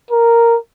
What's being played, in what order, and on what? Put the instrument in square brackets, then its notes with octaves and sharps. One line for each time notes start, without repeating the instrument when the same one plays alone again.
[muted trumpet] A#4